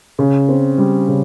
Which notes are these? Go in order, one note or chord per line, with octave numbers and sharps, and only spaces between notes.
C#3
C4
G3
C#3